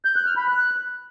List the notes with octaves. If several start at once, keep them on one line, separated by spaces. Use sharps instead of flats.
G6
F#6
F6
B5
F#6